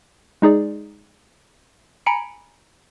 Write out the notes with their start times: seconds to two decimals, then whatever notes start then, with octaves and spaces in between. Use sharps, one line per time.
0.42 G#3 D#4 G#4 D5
2.06 G#5 A#5 B5 C#7 D7